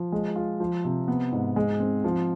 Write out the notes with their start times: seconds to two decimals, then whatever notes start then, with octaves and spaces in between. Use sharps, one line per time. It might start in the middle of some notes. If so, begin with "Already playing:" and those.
Already playing: F3
0.12 G#3
0.36 F4
0.60 F3
0.84 C3
1.08 B3
1.32 G#2
1.56 G#3
1.80 C4
2.04 F3